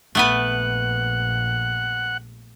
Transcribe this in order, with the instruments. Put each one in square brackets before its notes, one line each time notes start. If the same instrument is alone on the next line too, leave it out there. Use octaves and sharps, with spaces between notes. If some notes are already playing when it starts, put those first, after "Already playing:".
[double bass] A#1 [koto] A3 B3 B4 [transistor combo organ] F#5